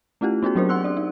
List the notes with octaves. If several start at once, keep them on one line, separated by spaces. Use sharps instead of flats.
A3 C#4 E4 F4 G4
B3 C#4 F#4 G#4
F#3 C4 D4 A#4 C5
F#5 C6 E6 F#6
D4 D5
D#4